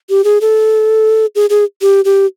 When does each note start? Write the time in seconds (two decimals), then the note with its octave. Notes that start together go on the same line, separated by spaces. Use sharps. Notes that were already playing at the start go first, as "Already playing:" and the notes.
0.10 G4
0.24 G#4
0.41 A4
1.35 G#4
1.50 G#4
1.82 G4
2.05 G4